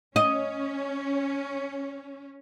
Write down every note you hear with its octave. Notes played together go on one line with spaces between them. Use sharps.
C#4 D#5